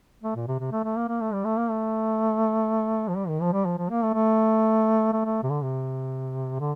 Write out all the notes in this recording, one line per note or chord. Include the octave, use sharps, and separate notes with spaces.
A3
A#2
C3
C3
A3
A3
A#3
A#3
A3
G3
A3
A#3
A3
F3
G3
D#3
F3
G3
F3
F3
A#3
A3
A3
A3
A3
C3
D3
C3
D3